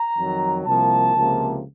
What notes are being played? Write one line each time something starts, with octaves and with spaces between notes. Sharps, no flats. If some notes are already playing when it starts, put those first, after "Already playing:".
Already playing: A#5
F2 D#3 F#3
C2 C3 F3 A#3 A5
C#2 C3 F3 A#3